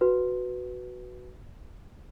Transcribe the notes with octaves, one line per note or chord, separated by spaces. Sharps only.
F#4 B4